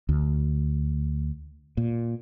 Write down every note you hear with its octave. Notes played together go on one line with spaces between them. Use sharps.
D2
A#2